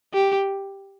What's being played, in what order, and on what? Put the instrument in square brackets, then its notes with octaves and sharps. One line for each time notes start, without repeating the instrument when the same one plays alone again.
[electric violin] G4